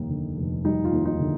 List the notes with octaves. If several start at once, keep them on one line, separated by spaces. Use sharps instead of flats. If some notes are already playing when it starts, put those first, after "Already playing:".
Already playing: F1 D#2 G3 D#4
D3
F1
G3 D#4
F4
D#2
D#4
D3